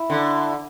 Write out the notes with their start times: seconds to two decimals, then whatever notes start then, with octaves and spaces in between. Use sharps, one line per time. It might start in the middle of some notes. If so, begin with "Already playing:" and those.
Already playing: E4
0.10 D3